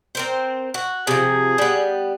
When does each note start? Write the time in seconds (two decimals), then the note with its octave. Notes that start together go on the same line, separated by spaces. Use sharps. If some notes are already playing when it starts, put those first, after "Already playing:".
0.15 C4 A#4 C5
0.74 F#4
1.07 C3 F3 G#4
1.58 G3 B3